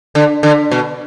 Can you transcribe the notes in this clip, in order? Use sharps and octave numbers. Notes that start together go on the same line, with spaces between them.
D3
D3
B2